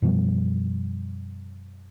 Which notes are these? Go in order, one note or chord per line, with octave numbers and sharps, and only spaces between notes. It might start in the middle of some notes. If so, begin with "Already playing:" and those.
F#2 B2 F3 G3